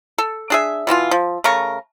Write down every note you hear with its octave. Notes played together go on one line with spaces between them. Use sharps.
A4
D4 G#4 E5
B2 E3 C4 F4
F3
C#3 A3 A#4 C#6